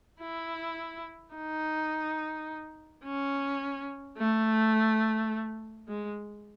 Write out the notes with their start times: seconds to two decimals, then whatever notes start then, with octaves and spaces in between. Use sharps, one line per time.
0.21 E4
1.34 D#4
3.04 C#4
4.17 A3
5.88 G#3